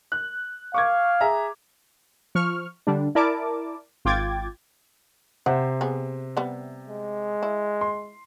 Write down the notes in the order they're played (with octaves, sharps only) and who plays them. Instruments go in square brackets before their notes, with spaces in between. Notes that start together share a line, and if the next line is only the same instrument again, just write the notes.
[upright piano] F#6
[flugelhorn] F5 [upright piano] C#6 D6 G#6
[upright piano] G#4 E5 A#5
[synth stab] F3 C#6 F6
D3 G3 D4
E4 A#4 D5 A5 D6
G#1 F4 G5 D6 G#6 A6
[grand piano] C3 C5 E5 [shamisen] F#5
[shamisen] B3 G#4
G3 B3
[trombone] G#3
[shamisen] E4
[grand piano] C6